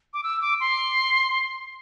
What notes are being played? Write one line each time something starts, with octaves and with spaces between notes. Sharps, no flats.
D6
E6
D6
C6